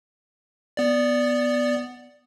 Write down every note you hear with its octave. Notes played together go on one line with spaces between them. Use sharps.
B3 D5